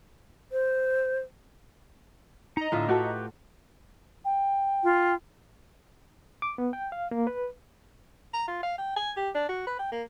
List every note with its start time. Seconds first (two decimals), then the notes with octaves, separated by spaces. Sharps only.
0.52 C5
2.57 D#4 D#5 A#5
2.72 A2 D3 F4 E5
2.89 F#4 G4 A4 B4 C#6
4.25 G5
4.84 F4
6.42 D6
6.58 B3
6.73 G5
6.92 F5
7.11 A#3
7.27 B4
8.34 A#5
8.48 F4
8.63 F5
8.78 G5
8.96 G#5
9.17 G4
9.35 D4
9.49 F#4
9.67 B4
9.79 G5
9.92 A#3